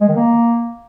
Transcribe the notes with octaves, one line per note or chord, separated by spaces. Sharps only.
G#3
D#3
A#3